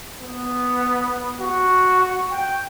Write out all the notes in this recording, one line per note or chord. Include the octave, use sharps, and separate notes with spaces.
B3
F#4
G5